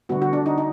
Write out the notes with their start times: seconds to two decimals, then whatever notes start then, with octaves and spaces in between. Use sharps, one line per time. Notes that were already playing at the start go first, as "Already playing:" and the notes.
0.09 D3 G3 B3 F#4
0.22 F#4
0.33 D4
0.46 D#4
0.58 D#4